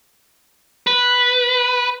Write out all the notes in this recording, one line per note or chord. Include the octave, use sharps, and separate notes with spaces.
B4